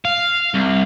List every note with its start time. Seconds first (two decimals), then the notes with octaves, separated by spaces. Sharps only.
0.05 F5
0.54 C2